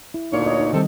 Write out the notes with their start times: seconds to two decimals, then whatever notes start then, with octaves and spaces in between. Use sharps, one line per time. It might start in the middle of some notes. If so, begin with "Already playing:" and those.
0.14 E4
0.33 D2 A#2 D#4 C#5 D5
0.46 D#5
0.60 D#4
0.73 C3 D#3 G3 C4 A4